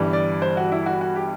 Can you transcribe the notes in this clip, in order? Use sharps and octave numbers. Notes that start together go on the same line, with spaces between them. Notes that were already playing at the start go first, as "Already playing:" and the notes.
Already playing: G1 G2 E3 G3
D5
C5
F#4
E4
F#4
F#4
G4